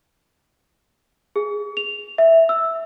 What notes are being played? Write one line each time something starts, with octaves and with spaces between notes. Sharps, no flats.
G#4
F7
E5
E6